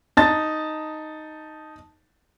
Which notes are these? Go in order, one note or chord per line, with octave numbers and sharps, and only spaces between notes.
D#4 A5 A6